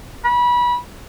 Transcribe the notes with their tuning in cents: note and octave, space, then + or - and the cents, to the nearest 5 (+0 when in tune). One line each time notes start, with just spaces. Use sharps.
B5 -25